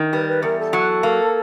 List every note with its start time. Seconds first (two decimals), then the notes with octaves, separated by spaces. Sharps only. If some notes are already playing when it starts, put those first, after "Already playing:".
Already playing: D#3
0.12 G3 B4
0.28 B4
0.42 E2 A#4
0.59 A4
0.73 F#3
1.03 A#3